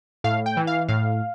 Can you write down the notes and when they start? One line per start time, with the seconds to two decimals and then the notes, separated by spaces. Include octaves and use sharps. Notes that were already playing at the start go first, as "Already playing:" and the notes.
0.24 A2 F5
0.46 G5
0.57 E3
0.67 F5
0.89 A2 F5